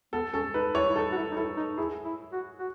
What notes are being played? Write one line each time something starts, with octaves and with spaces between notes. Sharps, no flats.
B3 A4
C#4 A4
D#4 B4
E4 C#5
E4
D#4 A4
F#4
E4
D#4
E4 A4
D#4
E4 G#4
E4
F#4
F#4